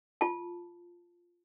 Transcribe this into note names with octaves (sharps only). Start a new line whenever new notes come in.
F4 A5